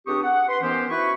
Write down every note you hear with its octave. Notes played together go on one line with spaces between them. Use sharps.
C#2 C4 D4 G4 C#6 D#6
F#5
B4 C6
D#3 E3 B3 C#4 G4 C5
E4 F#4 B4 C#6